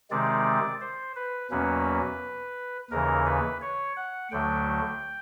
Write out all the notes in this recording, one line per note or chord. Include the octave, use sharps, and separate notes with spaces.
C3 D#3 G#3 C4 D5
C5
B4
E2 B2 F#3 A#3 C#4 B4
D#2 C#3 E3 A#4
B4
C#5
F#5
D2 D3 F#3 A3 G5